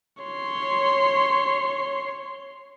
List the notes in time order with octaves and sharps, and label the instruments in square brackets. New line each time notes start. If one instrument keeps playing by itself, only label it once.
[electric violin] C#5 C6